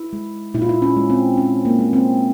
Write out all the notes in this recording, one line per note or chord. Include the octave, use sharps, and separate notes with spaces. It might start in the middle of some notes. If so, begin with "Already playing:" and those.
Already playing: E4
G#3
A#2 E4
F4
E4
C#4
G#3
C4
A#2 C#4
A#3
G#3
C4